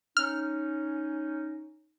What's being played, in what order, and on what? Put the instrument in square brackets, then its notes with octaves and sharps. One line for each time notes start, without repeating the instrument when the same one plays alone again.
[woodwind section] C#4 D#4 [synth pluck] F6